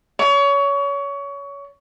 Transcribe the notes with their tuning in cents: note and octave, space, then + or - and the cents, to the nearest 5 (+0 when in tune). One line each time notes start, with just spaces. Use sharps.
C#5 +25